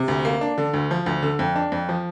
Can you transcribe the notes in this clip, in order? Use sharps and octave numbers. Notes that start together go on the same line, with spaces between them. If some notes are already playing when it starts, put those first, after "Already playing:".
Already playing: C3
D2
A#3
D4
D3
D2
F3
D2
D3
F2
D4
F2
F3